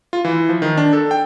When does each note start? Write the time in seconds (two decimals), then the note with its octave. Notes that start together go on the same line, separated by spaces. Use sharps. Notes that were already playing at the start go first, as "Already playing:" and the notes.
0.13 F4
0.25 E3
0.49 F3
0.62 D#3
0.77 D4
0.93 A4
1.11 G5